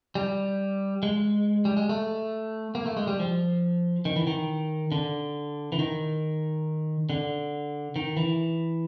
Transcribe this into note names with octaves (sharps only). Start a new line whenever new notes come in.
G3
G#3
G3
G#3
A3
A#3
A3
G#3
G3
F3
D#3
E3
D#3
D3
E3
D#3
D3
D#3
E3